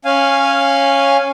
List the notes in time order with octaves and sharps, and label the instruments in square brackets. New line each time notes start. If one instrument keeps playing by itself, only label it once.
[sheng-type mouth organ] C#4 F5 G#5